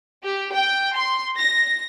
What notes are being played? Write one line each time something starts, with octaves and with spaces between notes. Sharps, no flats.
G4
G5
C6
A#6